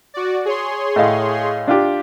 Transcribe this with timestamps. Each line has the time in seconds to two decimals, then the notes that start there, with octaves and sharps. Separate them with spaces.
0.14 F#4 D5
0.45 G#4 C#5 C6
0.96 A2 D#5 F5
1.68 D4 F4 G4